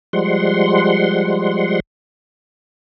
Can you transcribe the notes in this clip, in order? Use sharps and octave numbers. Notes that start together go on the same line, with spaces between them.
F3 G3 G#3 F#5 C6